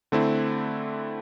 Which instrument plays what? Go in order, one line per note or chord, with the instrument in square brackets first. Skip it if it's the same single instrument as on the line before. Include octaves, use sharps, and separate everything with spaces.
[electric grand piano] D3 A3 C4 E4